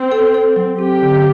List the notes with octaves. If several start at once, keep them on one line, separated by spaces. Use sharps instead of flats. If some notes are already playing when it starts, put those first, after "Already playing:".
Already playing: C4
A4
A4
F#3
C4 G4
D3